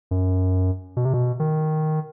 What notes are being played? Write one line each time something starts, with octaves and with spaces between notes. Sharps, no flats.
F#2
B2
C3
B2
D#3